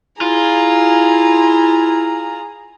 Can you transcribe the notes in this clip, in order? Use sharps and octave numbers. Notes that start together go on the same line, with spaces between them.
E4 F4 G#4 A#5